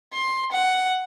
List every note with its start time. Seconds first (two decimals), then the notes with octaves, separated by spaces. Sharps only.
0.13 C6
0.52 F#5